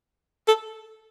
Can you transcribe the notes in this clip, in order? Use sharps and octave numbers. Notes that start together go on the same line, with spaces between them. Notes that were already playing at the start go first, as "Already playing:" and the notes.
A4